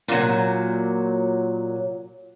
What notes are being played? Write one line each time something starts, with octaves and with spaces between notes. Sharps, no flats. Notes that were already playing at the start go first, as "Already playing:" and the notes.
A#2 F#3